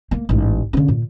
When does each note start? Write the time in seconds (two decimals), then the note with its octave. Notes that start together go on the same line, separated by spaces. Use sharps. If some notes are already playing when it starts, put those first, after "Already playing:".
0.11 A#3
0.29 A1 G#2
0.73 D3 C#4
0.88 A#2